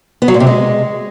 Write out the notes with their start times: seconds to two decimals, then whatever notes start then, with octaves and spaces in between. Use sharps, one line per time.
0.22 B3
0.28 F#3
0.34 A#2
0.40 C3
0.47 G#3